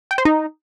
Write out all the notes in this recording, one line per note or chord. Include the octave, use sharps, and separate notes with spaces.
G5
C5
D#4